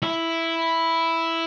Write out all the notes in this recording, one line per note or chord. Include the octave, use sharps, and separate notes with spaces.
E4